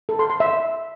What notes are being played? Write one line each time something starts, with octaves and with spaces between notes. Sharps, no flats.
A4
C6
C6
E5